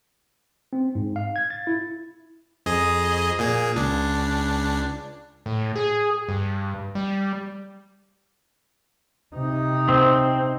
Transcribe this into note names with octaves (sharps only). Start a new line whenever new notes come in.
C4
G#2
F5
G#6
A6
E4
F2 G#4 D#5
A#2 G#4
C#2 D4
A2
G#4
G2
G3
C3 D#4
C4